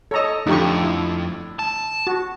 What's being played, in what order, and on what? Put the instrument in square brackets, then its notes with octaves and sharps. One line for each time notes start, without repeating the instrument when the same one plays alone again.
[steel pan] A4 A#5 [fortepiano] C#5 D#5
[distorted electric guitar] F2 [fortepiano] A2 D3 [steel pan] D#4 G4 C#6
[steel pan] E4
[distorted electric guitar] A5
[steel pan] F#4